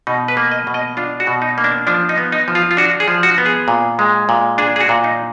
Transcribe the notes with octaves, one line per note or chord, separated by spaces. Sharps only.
B2 D#4
B4
A#3
D#5
B2
D#5
D4 F4
F#4
B2
D#4
A#3
D4
F3 D4
D#4
B3
D#4
F3
F4
F4
D4 F#4
G#4
F3
F#4
B3
G#4
A#2
G#3
A#2
D4 G#4
G#4
F#4
A#2
D#4